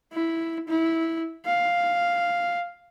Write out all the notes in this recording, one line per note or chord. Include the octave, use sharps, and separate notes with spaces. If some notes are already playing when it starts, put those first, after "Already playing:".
E4
E4
F5